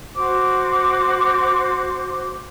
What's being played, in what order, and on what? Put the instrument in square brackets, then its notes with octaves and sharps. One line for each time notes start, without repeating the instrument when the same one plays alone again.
[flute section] F#4 C5 D6